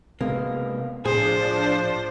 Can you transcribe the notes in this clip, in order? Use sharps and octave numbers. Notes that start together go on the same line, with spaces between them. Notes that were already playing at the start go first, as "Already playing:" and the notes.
C3 G#3 A#3 B3
A2 F3 D4 G#4 C5